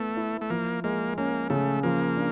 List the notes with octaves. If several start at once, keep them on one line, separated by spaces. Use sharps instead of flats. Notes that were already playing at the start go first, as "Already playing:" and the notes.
Already playing: A3 B3 E4
E4
A3
F3 A#3
G#3 A#3
A#3 C#4
C#3 A3
F3 A#3
D4